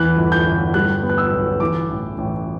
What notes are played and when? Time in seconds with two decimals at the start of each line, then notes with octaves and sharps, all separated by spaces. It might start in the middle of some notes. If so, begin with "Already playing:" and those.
Already playing: E2 E3 F#6
0.17 G1
0.32 G6
0.47 G1
0.74 G3 F#6
1.03 B3
1.09 F#6
1.18 E6
1.32 B1
1.60 E3 D6
1.90 A1
2.18 A1